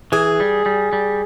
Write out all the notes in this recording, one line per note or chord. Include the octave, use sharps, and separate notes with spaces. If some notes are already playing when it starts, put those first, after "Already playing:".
E3 G#4
G3
G3
G3